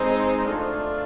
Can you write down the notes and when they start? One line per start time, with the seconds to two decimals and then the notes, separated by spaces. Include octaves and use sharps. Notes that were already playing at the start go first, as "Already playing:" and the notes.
Already playing: G#3 C4 D#4
0.44 A3 D4 F4